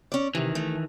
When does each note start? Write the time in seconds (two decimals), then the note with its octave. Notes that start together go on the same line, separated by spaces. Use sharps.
0.12 C#4 D5
0.35 C3 D#3 E3
0.55 A3